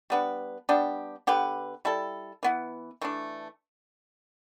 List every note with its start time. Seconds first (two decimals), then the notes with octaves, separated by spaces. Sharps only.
0.10 G3 B3 D4 B4
0.69 G3 B3 D4 G4
1.27 D3 B3 G4 B4
1.85 G3 E4 A4
2.43 E3 B3 E4
3.01 E3 A3 D4